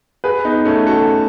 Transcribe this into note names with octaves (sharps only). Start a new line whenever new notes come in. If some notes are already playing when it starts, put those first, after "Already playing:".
G#4 B4
B3 D#4
A3 C#4
F#4 A4